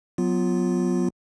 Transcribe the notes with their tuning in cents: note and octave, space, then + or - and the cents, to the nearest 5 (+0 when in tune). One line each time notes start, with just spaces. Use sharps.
F#3 -15 B3 +5 F4 +0